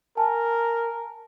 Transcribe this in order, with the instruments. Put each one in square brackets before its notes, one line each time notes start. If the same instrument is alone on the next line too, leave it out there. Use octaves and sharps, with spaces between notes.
[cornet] A#4 [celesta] G#5 A5